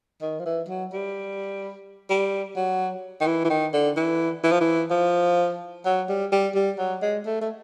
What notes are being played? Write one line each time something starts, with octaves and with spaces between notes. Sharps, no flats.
D#3
F3
E3
F#3
G3
G3
F#3
D#3
E3
E3
D#3
D3
E3
E3
F3
E3
F3
F#3
G3
G3
G3
F#3
G#3
A3
A3